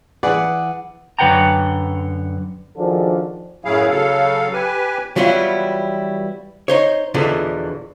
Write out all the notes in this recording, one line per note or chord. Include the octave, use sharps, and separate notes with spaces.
E3 G#4 B4 D5 F#5
F#2 D3 B4 F#5 G5 A#5
D#3 F3 D4 F#4 G#4 A4
F#2 A2 F#3 E4 G#4 F5
C#3 F#3 A4 F5
G4 B4 G#5
E3 F#3 G3 B3 E4 F4
D#4 C5 C#5
E2 B2 D3 E3 F3